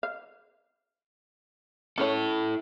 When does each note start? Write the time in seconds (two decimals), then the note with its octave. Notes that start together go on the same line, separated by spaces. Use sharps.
0.03 F5
1.98 C#4 E4 A4 C#5